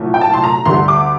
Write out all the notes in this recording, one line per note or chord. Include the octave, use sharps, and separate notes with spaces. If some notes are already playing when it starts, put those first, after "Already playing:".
Already playing: C2 A#2 F#3 A3
G5
A5
C6
A#5
D2 D3 G3 C6
D6